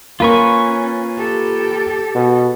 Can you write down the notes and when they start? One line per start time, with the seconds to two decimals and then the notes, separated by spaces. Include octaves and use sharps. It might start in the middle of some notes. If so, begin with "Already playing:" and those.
0.20 A#3 C#4 F4 B4 C#6
1.17 G4 A4
2.15 B2